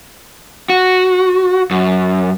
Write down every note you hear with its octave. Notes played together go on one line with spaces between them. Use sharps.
F#4
F#2